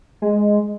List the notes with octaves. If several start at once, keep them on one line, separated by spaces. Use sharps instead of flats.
G#3